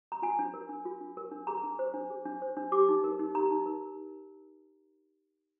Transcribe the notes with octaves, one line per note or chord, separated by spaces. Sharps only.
A#5
F4 G#5
D4
A#4
D4
F4
D4
A#4
D4
G#4 A#5
D4
C5
D4
G#4
D4
C5
D4
G4 D6
D#4
A#4
D#4
G4 A#5
D#4
A#4